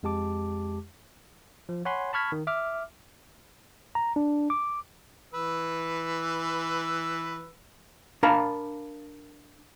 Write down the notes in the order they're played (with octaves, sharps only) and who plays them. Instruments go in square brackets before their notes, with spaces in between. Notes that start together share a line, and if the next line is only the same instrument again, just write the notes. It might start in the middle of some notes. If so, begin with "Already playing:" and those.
[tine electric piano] F2 G#3 G4 A5 D6
F3
C#5 F#5 G#5 B5 C6
A5 B5 C#6 F6 G#6 B6
D#3
E5 D6 F6
A#5
D4
D6
[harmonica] E3 B4 E6
[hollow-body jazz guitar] D4 A#4 F5 A#5 B5